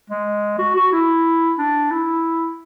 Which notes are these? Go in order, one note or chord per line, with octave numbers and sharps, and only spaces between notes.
G#3
F#4
F#4
E4
D4
E4